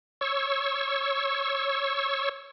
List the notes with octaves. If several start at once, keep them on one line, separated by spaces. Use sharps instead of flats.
C#5 C#6 E6